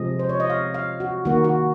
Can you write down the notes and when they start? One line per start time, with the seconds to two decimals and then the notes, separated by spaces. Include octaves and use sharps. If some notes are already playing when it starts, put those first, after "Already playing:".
Already playing: C3 F3 G#3 D#5
0.19 C5
0.29 C#5
0.40 D#5
0.50 F5
0.74 F5
1.00 F#4
1.25 D#3 A#3 F#4
1.44 F#4